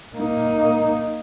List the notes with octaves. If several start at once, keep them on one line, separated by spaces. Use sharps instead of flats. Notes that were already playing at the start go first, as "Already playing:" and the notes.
A#3 D#4